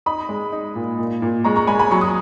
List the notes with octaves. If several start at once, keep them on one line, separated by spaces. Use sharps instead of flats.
D#4 B5 D#6
G#3
D#4
A#2
A#2
A#2
G#3 A#5 C#6
A#5 C#6
G#3 G#5 B5
G#5 B5
F#3 C#6
D#6